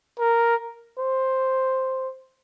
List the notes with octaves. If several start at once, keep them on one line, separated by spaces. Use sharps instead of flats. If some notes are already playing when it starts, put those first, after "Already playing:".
A#4
C5